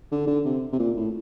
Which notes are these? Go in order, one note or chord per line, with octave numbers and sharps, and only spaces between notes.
D3
D3
C3
C3
A#2
A2